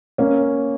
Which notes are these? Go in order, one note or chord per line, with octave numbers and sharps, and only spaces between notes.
A#3 C#4